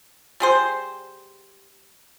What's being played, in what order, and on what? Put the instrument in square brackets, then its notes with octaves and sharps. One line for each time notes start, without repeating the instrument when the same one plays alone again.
[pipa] G3 G#4 C5